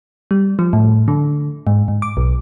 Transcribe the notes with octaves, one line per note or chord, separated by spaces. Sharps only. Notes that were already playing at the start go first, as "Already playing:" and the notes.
G3
F3
A2
D3
G#2
G#2
D6
B1